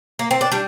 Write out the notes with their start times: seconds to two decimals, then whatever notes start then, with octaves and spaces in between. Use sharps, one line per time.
0.19 A#3
0.31 C4
0.41 D4
0.52 G3 D4